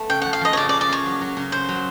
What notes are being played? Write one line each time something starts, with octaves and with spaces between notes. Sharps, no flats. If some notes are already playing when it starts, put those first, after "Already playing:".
Already playing: A3 B3
C#3 G5
F3 F#5
F5
F3 D#5
C#5
C#3 D5
D5
A#3
D5
A#3 C#5
F#3
F#3
C#3
C#3 C5
F#3